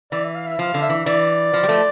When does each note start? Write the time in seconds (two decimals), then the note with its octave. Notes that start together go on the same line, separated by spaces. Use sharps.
0.12 E3 D5
0.24 E5
0.35 F5
0.47 E5
0.59 F3 F5
0.74 D3
0.82 E5
0.90 E3
1.06 E3 D5
1.53 F3
1.63 G3
1.68 F3 A3